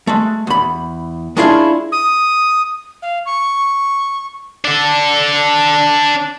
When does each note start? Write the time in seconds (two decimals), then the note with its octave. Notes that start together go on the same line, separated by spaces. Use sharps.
0.07 G#3 A3
0.47 E2 B5
1.37 G#3 C#4 D4 E4 F4 G#4
1.92 D#6
3.02 F5
3.26 C#6
4.65 D4 A4